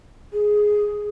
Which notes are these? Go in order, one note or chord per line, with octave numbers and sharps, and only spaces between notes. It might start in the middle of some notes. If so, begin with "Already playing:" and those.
G#4